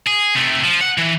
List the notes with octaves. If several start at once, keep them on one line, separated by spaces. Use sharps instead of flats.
G#4
C3 A3
F3
F#5
E3